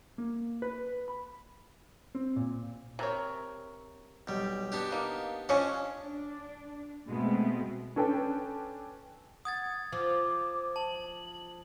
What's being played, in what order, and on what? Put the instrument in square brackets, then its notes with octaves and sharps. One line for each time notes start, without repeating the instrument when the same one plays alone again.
[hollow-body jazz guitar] A#3
B4
B5
C4
A#2
[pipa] C3 A#4 C#5
[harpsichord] B1 G3
B3 D4 G4
[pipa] A#3 D#4
[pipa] F3 C#5 G#5 [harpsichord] C#4 D4 D#5
[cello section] D4
B2 G#3 A3 B3 C4
[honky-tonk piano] C#4 D4 A4 B4 G5
[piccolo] F#5 [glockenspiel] D#6 G#6 A6
[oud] F3 [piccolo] D6
[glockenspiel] A5 [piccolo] F#7